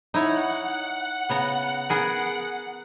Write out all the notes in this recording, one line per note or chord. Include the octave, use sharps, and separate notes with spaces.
D#4 E4 C#5 F#5
C#3 B3 A#5
B3 G#4 A#4